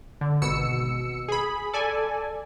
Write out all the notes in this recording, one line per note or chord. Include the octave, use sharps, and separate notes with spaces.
D3
G#1 B2 E6 C#7
G#4 B5
A4 D5 G#5